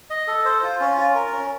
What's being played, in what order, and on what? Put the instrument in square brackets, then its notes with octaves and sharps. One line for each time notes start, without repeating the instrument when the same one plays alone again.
[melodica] D#5
A4
C5
F4
C#4
F4
A#4
C#4